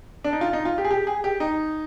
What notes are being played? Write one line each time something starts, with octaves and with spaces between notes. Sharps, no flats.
D4
D#4
F4
D#4
F4
G4
G#4
G4
G#4
G4
D#4